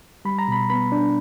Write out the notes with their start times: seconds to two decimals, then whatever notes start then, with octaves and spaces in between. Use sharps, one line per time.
0.25 G3 B5
0.39 A#5
0.48 B2 B5
0.70 B3 B5
0.92 D4